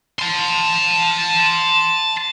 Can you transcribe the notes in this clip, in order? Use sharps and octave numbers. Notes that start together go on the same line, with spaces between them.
A5 C6